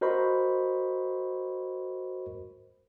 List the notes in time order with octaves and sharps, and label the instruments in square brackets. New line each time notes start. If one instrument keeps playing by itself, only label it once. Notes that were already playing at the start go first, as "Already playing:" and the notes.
[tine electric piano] F#4 A#4 C5 D#5 B5 C#6